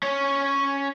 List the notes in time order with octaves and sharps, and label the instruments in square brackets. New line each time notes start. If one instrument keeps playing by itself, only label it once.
[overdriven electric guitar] C#4 C#5